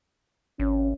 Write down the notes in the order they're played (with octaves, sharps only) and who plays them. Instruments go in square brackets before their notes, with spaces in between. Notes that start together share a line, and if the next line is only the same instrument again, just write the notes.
[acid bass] G#1 [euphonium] C#4